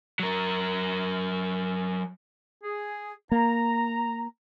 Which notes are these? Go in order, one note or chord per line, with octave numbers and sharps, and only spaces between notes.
F#3 A#4
G#4
A#3 A#5